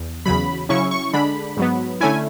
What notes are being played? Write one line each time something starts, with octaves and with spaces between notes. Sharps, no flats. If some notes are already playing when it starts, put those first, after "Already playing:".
Already playing: E2
E2 C#3 F#3 B5
C#3 F#3 C#4 E4 C#6
C#6
D3 G#3 D4 B5
G#2 F#3 B3
D3 A3 C#4 E4 G#5